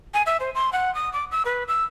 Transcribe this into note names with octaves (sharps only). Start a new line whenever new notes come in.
G#5
E5
C5
C6
F#5
D#6
D6
E6
B4
E6